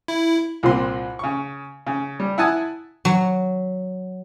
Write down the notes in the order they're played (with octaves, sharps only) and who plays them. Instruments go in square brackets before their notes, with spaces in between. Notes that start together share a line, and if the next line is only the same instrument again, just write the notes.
[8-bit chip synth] E4
[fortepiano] C2 A#2 C4 C6
C#3 C#6
C#3
G3
E4 F#5 G#5 A5 D#6
[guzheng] F#3